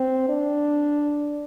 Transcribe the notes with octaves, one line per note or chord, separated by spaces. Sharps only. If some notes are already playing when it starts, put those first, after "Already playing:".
Already playing: C4
D4